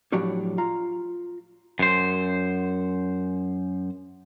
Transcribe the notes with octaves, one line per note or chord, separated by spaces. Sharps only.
A2 F3 F#3 D4 F#4 G4
F4 A#5
F#2 C5